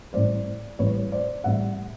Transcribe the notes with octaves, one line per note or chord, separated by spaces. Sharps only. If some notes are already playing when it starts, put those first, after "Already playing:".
A1 A2 E3 G3 C5 D5
A1 A2 E3 G3 B4 C#5
C5 D5
A1 A2 E3 G3 E5 F#5